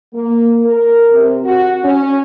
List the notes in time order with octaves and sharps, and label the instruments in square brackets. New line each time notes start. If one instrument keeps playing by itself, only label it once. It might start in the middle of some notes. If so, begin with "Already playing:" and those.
[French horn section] A#3
A#4
C3
F#4
C#4